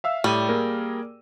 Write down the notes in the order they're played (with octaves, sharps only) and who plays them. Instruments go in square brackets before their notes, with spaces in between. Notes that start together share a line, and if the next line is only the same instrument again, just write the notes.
[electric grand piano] E5 F5 E6
[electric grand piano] A2 D#7 [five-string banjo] G3
[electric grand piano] A#3 G#4 A#4